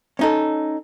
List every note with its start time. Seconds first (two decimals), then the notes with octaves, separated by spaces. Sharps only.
0.19 C#4 D#4 A4